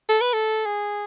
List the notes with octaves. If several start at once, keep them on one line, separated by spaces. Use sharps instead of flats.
A4
B4
A4
G#4